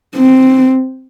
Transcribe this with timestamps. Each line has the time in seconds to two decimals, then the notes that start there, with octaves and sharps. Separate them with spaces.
0.16 C4